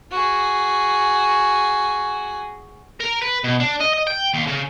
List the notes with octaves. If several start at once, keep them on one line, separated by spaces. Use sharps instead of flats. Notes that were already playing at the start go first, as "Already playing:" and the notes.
F#4 G#4
A#4
B4
B2
D4
D#5
D#5
G5
D#2
C#3